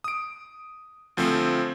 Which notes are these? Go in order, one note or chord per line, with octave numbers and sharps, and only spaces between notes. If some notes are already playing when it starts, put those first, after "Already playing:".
D#6 D7
D2 F3 A3 C4